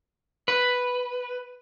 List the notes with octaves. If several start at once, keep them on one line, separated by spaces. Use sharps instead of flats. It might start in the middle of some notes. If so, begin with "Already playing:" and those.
B4